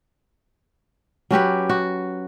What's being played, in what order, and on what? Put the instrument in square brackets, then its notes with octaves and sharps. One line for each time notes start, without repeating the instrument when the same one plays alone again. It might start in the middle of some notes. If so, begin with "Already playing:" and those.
[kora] F#3 C#4 G4 B4
F#4